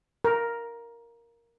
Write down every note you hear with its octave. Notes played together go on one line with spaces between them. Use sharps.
A#4